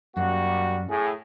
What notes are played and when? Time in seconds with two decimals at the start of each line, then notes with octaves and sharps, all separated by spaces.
0.17 F#2 G3 A#3 F#4
0.89 A2 G#4